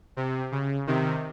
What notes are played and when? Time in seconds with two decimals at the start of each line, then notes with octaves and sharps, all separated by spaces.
0.17 C3
0.52 C#3
0.87 C3 D#3